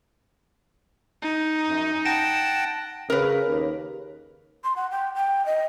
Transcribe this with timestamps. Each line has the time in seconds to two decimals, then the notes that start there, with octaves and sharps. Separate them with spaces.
1.22 D#4
1.68 F#2
2.05 F#5 G5 A5 A#6 D7 E7
3.10 C#3 A#4 B4
3.48 D#2
4.64 C6
4.76 F#5
4.91 G5
5.15 G5
5.46 D#5